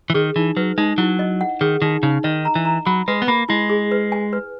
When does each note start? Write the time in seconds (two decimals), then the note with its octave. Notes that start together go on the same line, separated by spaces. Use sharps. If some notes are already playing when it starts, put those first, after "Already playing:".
0.10 E3
0.14 D#3 G#4
0.36 E3 D#4
0.57 F#3 B4
0.78 G#3 D#4
0.98 F#3 E4
1.19 D#5
1.41 F#5
1.61 D#3 G#4
1.82 D#3 D#4
2.03 C#3 D#4
2.24 D#3 D#5
2.45 A#5
2.55 E3
2.65 A#5
2.86 F#3 B5
3.08 G#3 B4
3.22 B3
3.28 A#3 B5
3.49 G#3 E4
3.70 G#4
3.92 B4
4.12 G#5
4.33 B4